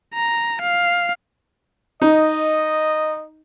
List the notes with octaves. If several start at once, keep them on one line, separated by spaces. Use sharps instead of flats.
A#5
F5
D#4 D#5